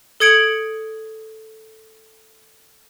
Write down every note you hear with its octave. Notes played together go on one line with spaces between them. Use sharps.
A4 D#6 G#6 C#7 D7 F#7